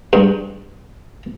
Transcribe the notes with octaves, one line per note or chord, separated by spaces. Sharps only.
G2